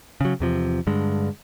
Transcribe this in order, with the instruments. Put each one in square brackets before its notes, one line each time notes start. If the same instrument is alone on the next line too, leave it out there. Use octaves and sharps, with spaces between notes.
[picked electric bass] C#3 F#3
E2 C3 F3
G2 D3 G#3